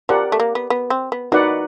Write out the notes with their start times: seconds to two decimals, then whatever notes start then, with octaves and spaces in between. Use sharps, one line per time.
0.09 F3 G4 A#4 D5 F#5
0.32 A3
0.40 A#3
0.55 B3
0.70 B3
0.90 C4
1.12 B3
1.32 A#3 D#4 F#4 B4 D5 F#5